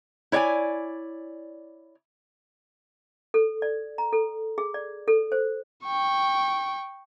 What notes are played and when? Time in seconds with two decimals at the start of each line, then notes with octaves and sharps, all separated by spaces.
0.32 E4 C#5 D5 F5 G#5
3.34 A4
3.62 D5
3.98 A#5
4.13 A4
4.58 G#4
4.74 D5
5.08 A4
5.32 C5
5.84 G5 C#6